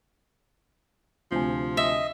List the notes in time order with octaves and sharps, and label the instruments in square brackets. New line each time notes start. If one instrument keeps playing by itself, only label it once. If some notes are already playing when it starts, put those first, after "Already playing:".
[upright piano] D2 C3 G#5 [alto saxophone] F3
[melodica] D#5 [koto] E5